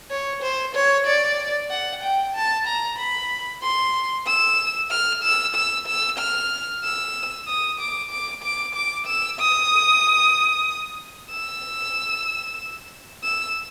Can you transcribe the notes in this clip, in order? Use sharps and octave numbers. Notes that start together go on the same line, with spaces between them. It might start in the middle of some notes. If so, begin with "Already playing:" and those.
C#5
C5
C#5
D5
F#5
G5
A5
A#5
B5
C6
E6
F6
E6
E6
E6
F6
E6
D#6
D6
D6
D6
D6
E6
D#6
E6
E6